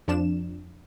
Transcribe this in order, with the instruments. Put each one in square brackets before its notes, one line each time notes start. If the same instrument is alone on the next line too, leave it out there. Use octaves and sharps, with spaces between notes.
[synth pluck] F2 F3 D4 E7